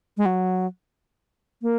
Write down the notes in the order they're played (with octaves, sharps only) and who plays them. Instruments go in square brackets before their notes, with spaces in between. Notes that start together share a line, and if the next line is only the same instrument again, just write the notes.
[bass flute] G#3
F#3
A#3